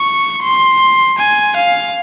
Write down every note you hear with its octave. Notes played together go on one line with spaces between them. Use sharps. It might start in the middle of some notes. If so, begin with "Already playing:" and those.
Already playing: C#6
C6
G#5
F5